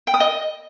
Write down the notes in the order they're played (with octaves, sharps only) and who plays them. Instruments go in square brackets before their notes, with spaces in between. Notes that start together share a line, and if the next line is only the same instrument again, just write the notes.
[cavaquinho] G5
D#6
D#5